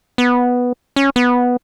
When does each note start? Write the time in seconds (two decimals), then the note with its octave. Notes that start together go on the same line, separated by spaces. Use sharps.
0.18 B3
0.96 C#4
1.16 B3